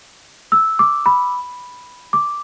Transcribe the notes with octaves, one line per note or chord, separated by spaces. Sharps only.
E6
D6
B5
D6